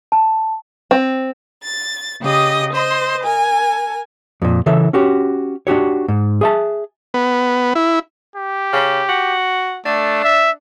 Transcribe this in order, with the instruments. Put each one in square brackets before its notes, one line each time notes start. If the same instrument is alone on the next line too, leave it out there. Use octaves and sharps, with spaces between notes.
[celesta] A5
[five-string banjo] C4
[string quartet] A6
C#3 G4 D#5 D#6
C5 D#5 C6
A#4 G#5
[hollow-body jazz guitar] F2 A#2
C#3 E3 A4 E5
C#4 F#4 G4
D4 F#4 G4 C#5
G#2
G#4 E5 A5
[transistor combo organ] B3
E4
[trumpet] G4
[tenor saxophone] C#3
F#4
[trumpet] A3 [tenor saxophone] D4
[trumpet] E5